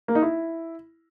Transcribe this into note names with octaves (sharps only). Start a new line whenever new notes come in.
A#3
D#4
E4